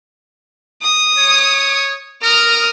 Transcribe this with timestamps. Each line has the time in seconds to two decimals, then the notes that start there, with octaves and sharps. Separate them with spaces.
0.82 D#6
1.17 C#5
2.23 A#4 D#6 F6